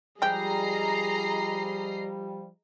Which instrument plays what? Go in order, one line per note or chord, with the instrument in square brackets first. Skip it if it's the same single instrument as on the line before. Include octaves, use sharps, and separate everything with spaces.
[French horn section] F3 G3 [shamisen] G#3 G4 [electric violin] G#4 [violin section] D#5 A#5 C7